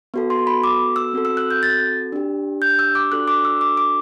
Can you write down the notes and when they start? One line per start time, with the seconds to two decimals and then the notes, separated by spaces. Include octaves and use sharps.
0.14 B3 F#4 A4
0.30 C6
0.47 B5
0.64 D6
0.96 E6
1.13 C4 F#4 A4
1.25 E6
1.37 F#6
1.51 G6
1.63 A6
2.12 D4 G4
2.62 G6
2.79 E6
2.95 D6
3.12 D4 F#4 A4 F#6
3.28 D6
3.45 E6
3.61 D6
3.77 D6